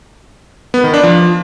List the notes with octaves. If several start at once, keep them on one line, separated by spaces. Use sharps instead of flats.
B3
D#3
D4
F3